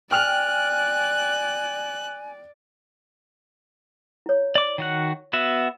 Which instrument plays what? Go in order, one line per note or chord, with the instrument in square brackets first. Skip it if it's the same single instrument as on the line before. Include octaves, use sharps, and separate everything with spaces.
[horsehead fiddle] D5 [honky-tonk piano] G5 F6 F7 [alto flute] G#5 [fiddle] F#6
[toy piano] E4 C#5
[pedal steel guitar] D5 D6
D#3 F#4 F#5
B3 F#4 E5